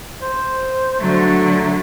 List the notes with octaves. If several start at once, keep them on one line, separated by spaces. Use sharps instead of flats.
C5
D3 F#3 A3